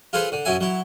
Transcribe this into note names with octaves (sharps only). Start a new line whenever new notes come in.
F4 G#4 A4 B4 C5
D3
F#2 F#3 E4 G#5
F#3 E4